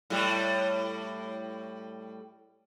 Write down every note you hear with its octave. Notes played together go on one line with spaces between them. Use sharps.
A2 G3